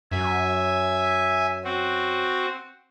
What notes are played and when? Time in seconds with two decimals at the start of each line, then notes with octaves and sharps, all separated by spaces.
0.11 F#2 E5 G#5
1.64 C4 F#4